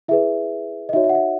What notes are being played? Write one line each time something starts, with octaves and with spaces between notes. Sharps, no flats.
E4 G#4 B4 E5
D#5
D#4 F#4 C#5 E5
E5
F#5
E5